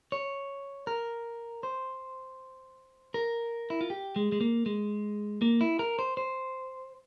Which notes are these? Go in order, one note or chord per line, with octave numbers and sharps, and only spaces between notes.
C#5
A#4
C5
A#4
E4
F4
G4
G#3
G#3
A#3
G#3
A#3
E4
A#4
C5
C5